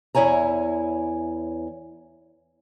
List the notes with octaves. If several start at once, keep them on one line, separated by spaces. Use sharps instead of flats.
E2 E4 C#5 G#5 A#5